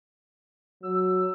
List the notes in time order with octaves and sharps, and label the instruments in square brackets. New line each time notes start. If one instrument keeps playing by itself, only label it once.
[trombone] F#3 [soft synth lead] E6